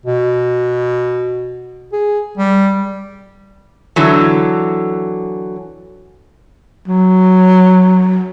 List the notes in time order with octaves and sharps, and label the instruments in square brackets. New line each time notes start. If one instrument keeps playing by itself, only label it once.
[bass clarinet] B2
G#4
G3
[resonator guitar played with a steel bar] D3 E3 F#3
[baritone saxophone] F#3